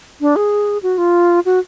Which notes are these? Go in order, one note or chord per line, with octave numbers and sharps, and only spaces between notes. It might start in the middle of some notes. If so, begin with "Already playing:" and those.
D4
G#4
F#4
F4
F#4